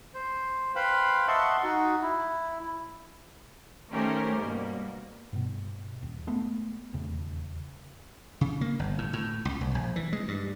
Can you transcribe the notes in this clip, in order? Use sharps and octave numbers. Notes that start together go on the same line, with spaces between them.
C5
B4 C5 F5 G5 B5
D#5 E5 F#5 A5 C6 C#6
D#4 F#4
E4
D#3 A3 C#4 G4 A#4 C5
G2 B2 A#3
G2 B2
D#1
G#3 A3 B3
D#1 E2 C#3 A3
C#3
A#3
G1
A2
A2
C#2
C2
A#1
E3
G#3
G2